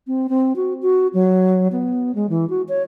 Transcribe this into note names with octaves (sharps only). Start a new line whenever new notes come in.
C4
C4
F#4
F#4
F#3
B3
G#3
E3
F#4
C#5